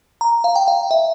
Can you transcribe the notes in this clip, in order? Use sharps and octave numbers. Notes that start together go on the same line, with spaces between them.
A#5
F5
G5
F5
E5